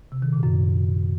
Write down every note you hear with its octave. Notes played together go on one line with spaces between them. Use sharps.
C3
D#3
A#2
F#2